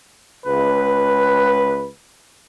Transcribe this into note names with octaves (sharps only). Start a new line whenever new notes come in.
C#2 B4